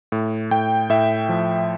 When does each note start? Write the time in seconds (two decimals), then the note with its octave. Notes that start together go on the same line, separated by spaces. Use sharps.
0.12 A2
0.51 A2 G5
0.90 A2 E5
1.29 F3